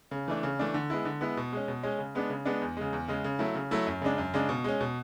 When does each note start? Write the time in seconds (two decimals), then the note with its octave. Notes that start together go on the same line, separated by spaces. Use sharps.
0.11 C#3
0.28 E3 A3 D4
0.43 C#3
0.59 E3 A3 D4
0.74 D3
0.90 G#3 B3 E4
1.05 D3
1.21 G#3 B3 E4
1.37 B2
1.52 G#3 C#4
1.68 B2
1.83 G#3 C#4
1.99 C#3
2.15 G#3 B3 D4
2.30 C#3
2.45 G#3 B3 D4
2.62 E2
2.77 C#3 G#3
2.93 E2
3.08 C#3 G#3
3.24 C#3
3.39 F#3 A3 E4
3.55 C#3
3.71 F#3 A3 E4
3.87 F#2
4.01 C#3 G#3 D4
4.18 F#2
4.34 C#3 G#3 D4
4.49 B2
4.64 G#3 C#4
4.81 B2